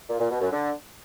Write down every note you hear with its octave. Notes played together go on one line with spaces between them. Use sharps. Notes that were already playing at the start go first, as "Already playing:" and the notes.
A#2
A#2
B2
F#2
D3